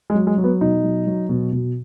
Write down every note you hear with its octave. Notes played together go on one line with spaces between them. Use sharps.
G#3
F#3
G#3
F#3
B3
B2 D#4
F#3
F#3
B2
B2